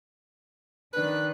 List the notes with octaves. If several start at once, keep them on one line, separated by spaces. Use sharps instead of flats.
D#3 D4 B4 F#6